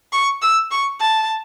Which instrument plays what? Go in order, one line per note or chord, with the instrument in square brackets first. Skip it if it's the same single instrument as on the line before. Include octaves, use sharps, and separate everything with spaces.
[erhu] C#6
E6
C#6
A5